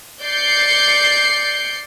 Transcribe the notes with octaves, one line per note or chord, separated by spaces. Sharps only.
D5 G6 C7 C#7